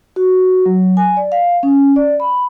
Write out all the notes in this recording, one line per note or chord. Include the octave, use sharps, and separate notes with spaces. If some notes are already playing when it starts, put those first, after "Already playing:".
F#4
F#3
G#5
D5
F5
C#4
D5
B5